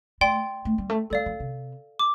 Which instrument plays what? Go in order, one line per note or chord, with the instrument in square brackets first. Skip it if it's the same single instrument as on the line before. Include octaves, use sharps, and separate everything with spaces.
[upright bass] A3 [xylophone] D5 G5 C6
[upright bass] A3
G3
A3
[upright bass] G3 [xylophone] A4 D5 F5
[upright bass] F3
C3
[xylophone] D6